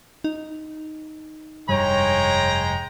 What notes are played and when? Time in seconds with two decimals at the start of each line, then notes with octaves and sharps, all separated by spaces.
0.24 D#4
1.69 F1 G2 G3 G#3 C#5 G5 A#5